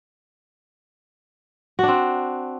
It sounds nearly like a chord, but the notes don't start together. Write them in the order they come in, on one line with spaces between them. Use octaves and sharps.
F#4 D4 C4